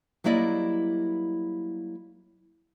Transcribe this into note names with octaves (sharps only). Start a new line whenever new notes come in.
F#3 G3 A#3 E4 D5 D#5